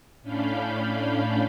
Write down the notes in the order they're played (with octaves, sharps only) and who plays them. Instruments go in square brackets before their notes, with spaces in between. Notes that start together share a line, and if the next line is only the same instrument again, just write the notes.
[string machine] A2 C#4 D4 F5 B5 G6